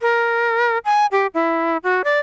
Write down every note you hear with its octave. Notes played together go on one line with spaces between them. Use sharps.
A#4
G#5
G4
E4
F#4
D5